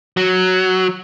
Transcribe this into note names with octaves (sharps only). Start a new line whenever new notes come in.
F#3